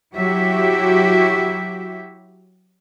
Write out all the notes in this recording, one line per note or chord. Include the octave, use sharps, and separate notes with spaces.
F#3 E4 F#4 G4 E5